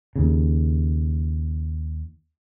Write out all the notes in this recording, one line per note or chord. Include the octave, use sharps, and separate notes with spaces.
D#2 C#3